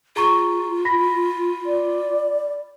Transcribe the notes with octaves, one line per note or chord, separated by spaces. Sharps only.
F4 G#4 A#5 C#6
B5 A#6 B6
D5